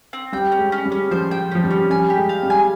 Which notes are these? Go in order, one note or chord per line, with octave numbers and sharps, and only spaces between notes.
C4
G3 G5
C#4
G#3
C#4
G3
C#4
F3 C5
G5
F3 C#4
G3
C#4
G3 G#5
G4
G#3
F5
G3
G#5